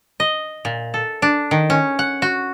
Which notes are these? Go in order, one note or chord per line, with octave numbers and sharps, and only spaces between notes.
D#5
A#2
A4
D4
D#3
C#4
F#5
F#4